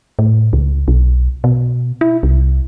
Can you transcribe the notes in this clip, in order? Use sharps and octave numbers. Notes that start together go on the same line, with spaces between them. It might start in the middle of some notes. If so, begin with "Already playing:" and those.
A2
C#2
B1
B2
E4
C2